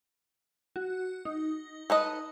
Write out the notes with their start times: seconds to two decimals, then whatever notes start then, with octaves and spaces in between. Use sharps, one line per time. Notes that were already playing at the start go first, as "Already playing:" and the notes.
0.76 F#4
1.25 D#4
1.90 A4 B4 D#5